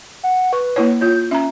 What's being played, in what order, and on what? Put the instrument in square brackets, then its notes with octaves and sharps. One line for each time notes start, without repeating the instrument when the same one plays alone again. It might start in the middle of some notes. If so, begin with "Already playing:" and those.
[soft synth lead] F#5
[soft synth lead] B4 [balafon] C#6
[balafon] A#3 E4 C#5
[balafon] F4 C#5 [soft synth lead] G6
[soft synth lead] C#4 [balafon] E5 A#5